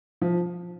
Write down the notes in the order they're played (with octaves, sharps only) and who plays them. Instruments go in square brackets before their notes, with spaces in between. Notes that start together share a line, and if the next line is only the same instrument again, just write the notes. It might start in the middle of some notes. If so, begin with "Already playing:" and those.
[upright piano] F3